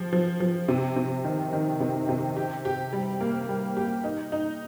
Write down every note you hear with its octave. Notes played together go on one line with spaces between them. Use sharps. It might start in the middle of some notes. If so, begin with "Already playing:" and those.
Already playing: F3 G4
F3
F3
C3
C3
D#3
D#3
C3
C3
G4
G4
G3
A#3
G3
G4
D#4
D#4